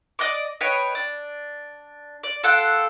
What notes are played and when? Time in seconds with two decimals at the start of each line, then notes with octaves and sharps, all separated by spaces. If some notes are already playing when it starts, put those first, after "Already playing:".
0.19 D5 D#5 F#5 D6
0.61 B4 C#5 D#5 G5
0.95 D4
2.23 D5
2.43 F4 A4 F#5 G5